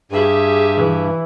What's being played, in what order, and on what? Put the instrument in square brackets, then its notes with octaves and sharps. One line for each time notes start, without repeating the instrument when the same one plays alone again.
[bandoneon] G2 [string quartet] G4 E5 G#5 [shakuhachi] G#4
[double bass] E3